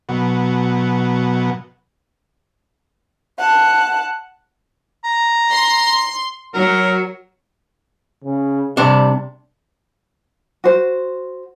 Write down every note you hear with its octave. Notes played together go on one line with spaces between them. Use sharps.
B2 F#3
F#5 A5
A#5
C6
F#3 A#4
C#3
C3 G3 D4
F#4 C5